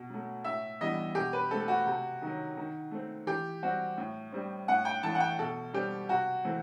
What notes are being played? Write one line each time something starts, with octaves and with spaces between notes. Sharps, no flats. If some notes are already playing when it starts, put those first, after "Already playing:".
Already playing: B2
F#3 A3
A2 E5
E3 G3 B3 D#5
B2 G4
B4
A3 C4 A4
F#4
C3
D#3 F#3
D#3
A3 C4
E3 G4
G3 C4 F#4
A2
G3 C4
A2 F#5
G5
E3 A3 A5
F#5
G5
B2 A4
G3 C4 G4
C3 F#4
E3 A3 C4